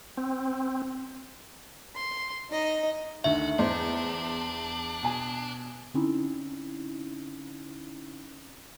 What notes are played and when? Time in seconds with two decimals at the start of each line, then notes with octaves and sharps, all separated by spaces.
0.17 C4
1.95 C6
2.50 D#4 D#5
3.24 D2 D3 D#3 F#4 E5
3.59 E2 D4 C5
5.03 B2 G#5
5.94 D3 C4 C#4 D#4 E4